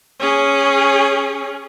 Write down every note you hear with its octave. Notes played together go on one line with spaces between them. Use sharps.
C#4 G#4